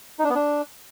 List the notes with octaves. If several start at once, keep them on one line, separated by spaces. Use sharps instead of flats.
D#4
D4
B3
D4